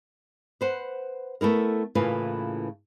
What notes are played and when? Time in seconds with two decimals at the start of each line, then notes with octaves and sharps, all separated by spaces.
0.61 B4 C5 F#5
1.41 A3 B3 E4 A#4
1.95 A2 C#3 E3 A#3 F4 B4